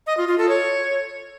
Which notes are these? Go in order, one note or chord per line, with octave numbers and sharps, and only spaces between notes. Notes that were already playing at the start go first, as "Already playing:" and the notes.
D#5
F4
F4
A4
C#5